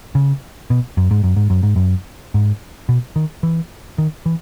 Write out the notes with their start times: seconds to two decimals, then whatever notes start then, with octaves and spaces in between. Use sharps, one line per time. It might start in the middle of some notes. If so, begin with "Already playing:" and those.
0.15 C#3
0.70 B2
0.97 F#2
1.11 G#2
1.24 F#2
1.36 G#2
1.50 F#2
1.63 G#2
1.76 F#2
2.34 G#2
2.89 B2
3.16 D#3
3.43 E3
3.98 D#3
4.26 E3